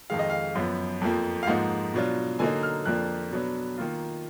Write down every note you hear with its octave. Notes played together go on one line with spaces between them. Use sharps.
F2 D#3 G#3 F5
D#5
F5
F#2 F3 B3
F2 F3 A#3
F5
G#2 F3 A#3 D#4 F#5
B2 F#3 D4 F4
D3 F#3 A#3 D#4 G#5
F6
F2 F3 A#3 D4 F#6
B2 F#3 B3 D4
D#3 A#3 F4